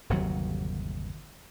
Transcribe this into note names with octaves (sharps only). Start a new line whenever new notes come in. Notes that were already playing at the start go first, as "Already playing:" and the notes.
G1 D#2 C3 F#3